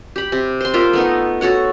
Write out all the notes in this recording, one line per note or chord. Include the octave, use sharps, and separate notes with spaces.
G4 B5
C3
C5 C6
A#3 F4 E5
A3 B3 D#4
F#4 A4 C#5 F#5